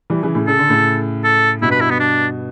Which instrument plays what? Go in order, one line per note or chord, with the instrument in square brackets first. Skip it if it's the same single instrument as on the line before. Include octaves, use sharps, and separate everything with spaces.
[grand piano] E3 G3
C#3 E3
A2 C#3
[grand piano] C#3 [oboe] A4
[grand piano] D3
A2 C#3
[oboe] A4
[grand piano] G2 B2 [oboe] E4
[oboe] B4
E4
B3
D4